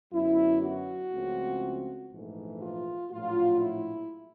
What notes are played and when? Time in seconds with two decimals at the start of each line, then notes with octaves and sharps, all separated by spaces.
0.12 F#2 D3 F#3 B3 E4
0.61 F#4
1.12 C#2 C#3 F3 A3 C4
2.10 A#1 G#2 E3 A3
2.61 F4
3.10 A#1 A2 F#3 A#3 F4
3.61 E4